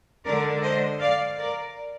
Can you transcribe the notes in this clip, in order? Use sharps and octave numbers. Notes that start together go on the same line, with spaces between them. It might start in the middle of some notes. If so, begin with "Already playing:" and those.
D3 G#3 D4 A#4 D5
C5 D#5
D5 F5
A#4 D5